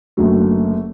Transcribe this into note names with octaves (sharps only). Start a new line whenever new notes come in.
F#1 F#2 D3 F#3 A3